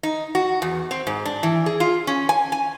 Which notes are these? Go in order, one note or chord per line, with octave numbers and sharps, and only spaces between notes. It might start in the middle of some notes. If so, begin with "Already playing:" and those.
D#4
F#4
E2
C4
G#2
D4
E3
G#4
F4
C#4
G#5
G#5